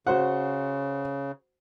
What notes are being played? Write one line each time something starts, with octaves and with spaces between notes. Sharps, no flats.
C#3 F#4 C5 F#5